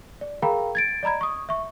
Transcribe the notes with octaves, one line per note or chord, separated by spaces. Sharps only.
D5
G#4 A#4 F5 G5 A#5 B5
G#6 A6 D7
D5 D#5 A#5 B5 G#6
C#6 D#6
E5 C#6